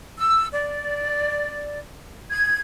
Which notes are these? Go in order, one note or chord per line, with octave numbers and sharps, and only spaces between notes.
E6
D5
G#6